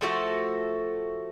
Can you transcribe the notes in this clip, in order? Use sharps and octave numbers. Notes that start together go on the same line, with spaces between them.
F3 A3 F#4 A4